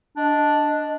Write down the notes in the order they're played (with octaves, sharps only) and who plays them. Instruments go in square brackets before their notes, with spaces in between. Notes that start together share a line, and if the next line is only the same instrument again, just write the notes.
[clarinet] D4 [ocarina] D#5